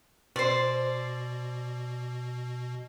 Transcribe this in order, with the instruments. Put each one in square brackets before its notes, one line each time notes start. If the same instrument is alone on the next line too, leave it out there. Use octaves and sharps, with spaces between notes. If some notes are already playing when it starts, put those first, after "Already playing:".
[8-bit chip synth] B2 [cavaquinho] C5 D5